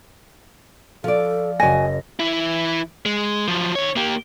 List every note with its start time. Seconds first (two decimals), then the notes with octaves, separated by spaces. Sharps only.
1.04 F3 A4 D5
1.60 F#1 F#4 D#5 G#5 A#6
2.20 E3 E4
3.06 G#3
3.48 F3 F#3
3.75 D#3 C#5
3.96 A#3 G4